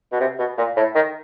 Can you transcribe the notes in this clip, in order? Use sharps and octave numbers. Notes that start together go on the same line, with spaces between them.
B2
C3
B2
A#2
A2
D#3